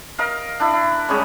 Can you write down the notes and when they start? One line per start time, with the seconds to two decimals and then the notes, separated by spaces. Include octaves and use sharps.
0.18 A#4 D#5 F5
0.60 D4 E4
0.73 E4
1.08 C#3 G3 G#3 C#4